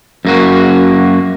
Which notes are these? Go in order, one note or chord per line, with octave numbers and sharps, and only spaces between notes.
F#2 A#3 F#4